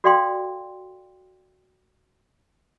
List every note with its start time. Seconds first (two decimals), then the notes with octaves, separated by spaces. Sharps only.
0.04 F#4 A4 D5 F5 G5 C6